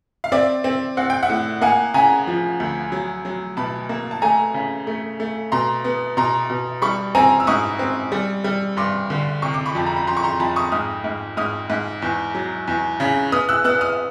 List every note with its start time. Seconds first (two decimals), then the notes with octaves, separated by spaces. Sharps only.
0.24 F5
0.32 C4 D5 E5
0.64 C4
0.97 C4 F#5
1.10 G5
1.23 E5 F#5
1.30 A2
1.61 A#3 F#5 G#5
1.94 C#3 G#5 A#5
2.27 F3
2.60 D2
2.92 F#3
3.25 F#3
3.57 B2 A5 B5
3.89 A#3
4.11 A5
4.22 A3 G#5 A#5
4.54 C#3
4.87 A3
5.20 A3
5.52 B2 A#5 C6
5.84 B3
6.17 B2 A#5 C6
6.50 B2
6.82 G3 B5 C#6
7.15 C4 G#5 A#5
7.40 E6
7.47 G#2 C#6 D#6
7.79 C4
8.12 G3
8.44 G3
8.77 G2 C6 D6
9.10 D3
9.42 C3 C#6
9.54 D6
9.65 B5 C#6
9.75 F2 A5
9.86 A#5
9.96 B5
10.07 F2 A#5 C6
10.17 C#6
10.23 A#5 C6
10.40 F2 A5 B5
10.56 C#6 D#6
10.72 G#2 D#6 F6
11.04 G#2
11.37 G#2 D#6 F6
11.70 G#2
12.02 E2
12.35 F#3
12.68 E2
13.00 C#3
13.32 B3 D#6 F6
13.49 E6 F#6
13.64 B3 E6 F#6
13.81 D#6 F6